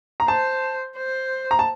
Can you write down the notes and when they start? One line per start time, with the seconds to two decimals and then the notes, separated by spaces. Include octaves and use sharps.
0.20 A#5
0.28 C5 A5
0.97 C5
1.51 A#5
1.59 A5